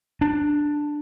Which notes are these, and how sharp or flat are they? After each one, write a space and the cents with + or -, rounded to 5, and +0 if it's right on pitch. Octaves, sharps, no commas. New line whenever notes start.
D4 +5